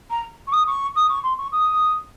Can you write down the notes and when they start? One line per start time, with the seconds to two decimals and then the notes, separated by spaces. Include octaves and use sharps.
0.10 A#5
0.47 C#6
0.52 D#6
0.67 C#6
0.95 D#6
1.09 C#6
1.23 C6
1.38 C#6
1.52 D#6